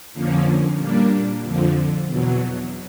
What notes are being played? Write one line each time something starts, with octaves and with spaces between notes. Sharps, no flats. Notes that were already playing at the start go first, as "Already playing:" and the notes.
F2 D3 F3 A#3 C#4
A#2 G3 A#3 D4
F2 D3 F3
E2 B2 F#3